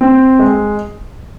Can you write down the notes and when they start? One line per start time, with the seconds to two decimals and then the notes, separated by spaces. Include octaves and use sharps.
0.01 C4
0.39 G#3